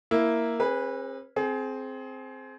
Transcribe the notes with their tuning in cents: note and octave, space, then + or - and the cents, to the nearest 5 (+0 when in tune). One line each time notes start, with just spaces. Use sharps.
A#3 +0 E4 +0
C4 +40 G#4 -20 B4 -15
C4 +0 G#4 +30